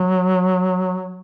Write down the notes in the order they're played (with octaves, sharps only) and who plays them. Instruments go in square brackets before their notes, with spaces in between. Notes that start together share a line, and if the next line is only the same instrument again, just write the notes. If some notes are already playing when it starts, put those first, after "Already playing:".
Already playing: [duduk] F#3